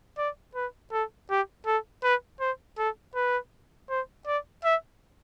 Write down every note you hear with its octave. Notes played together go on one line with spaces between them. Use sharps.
D5
B4
A4
G4
A4
B4
C5
A4
B4
C5
D5
E5